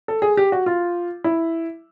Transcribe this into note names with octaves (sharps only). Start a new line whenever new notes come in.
A4
G#4
G4
F#4
F4
E4